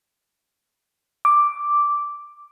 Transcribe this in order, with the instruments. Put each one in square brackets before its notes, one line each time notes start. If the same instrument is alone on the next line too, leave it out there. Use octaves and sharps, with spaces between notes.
[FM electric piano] D6